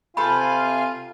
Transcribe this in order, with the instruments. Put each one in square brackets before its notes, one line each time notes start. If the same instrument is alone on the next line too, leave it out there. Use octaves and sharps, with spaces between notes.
[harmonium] C3 F5 G#5 [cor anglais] F4 [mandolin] A4 B4 G5 [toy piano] B5